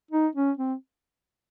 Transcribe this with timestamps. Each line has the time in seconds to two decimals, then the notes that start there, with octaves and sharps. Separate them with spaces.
0.11 D#4
0.35 C#4
0.57 C4